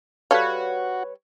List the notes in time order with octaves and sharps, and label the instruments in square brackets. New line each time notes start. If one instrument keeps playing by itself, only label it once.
[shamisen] G3 A4 F5 [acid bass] F#4 [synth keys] B4 C#5